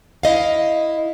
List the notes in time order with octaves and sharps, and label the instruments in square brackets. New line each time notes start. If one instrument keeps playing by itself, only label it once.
[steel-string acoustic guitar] E4 D#5 F5